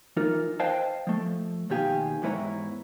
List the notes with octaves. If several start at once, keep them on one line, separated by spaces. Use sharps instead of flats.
E3 D#4 F4 A#4
B4 C5 D#5 F5 G5 A5
F3 A3
D#2 B2 D#3 G4 G#4 F5
E2 G#2 E4 B4 C#5 A#5